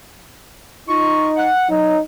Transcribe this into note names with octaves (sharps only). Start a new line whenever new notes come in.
D#4 F4 D#5 C#6
F#5
F#3 D#4